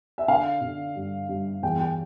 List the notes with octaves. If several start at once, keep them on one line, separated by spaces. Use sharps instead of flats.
E5
D3 F5
D3
G2
G2
E2 G5
G5